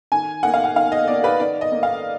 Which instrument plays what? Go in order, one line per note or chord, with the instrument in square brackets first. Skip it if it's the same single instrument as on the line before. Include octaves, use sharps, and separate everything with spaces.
[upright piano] D#3 G#5
A#3 D#4 F#5
F5
F#5
D#3 F5
D#5
A#3 D#4 D5
B4
D#3 D5
D#5
A#3 D#4
F5